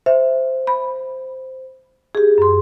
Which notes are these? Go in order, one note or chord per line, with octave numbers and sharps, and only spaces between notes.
C5 E5
B5
G4 G#4
F#2 C6